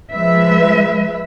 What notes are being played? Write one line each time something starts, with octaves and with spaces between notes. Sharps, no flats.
F3 G#3 B4 E5